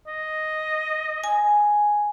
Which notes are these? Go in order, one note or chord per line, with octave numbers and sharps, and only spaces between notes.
D#5
G#5